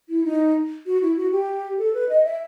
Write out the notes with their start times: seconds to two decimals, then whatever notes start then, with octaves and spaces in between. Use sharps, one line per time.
0.09 E4
0.24 D#4
0.87 F#4
1.02 E4
1.17 F#4
1.32 G4
1.78 A4
1.94 B4
2.09 D#5
2.24 E5